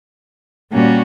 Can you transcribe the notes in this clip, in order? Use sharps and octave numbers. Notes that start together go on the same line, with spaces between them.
A#2 G3 A#3 C#4 F#4